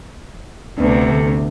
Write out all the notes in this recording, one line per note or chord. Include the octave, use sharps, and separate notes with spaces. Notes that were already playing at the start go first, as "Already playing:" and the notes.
D2 C3 B3 D4
D3 A3